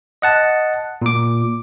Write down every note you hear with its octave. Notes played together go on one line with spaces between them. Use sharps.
D#5 F#5 A5
A#2 D6